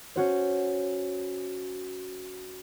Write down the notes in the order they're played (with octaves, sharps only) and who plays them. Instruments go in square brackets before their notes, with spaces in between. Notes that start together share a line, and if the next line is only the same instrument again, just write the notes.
[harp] C#4 F#4 C5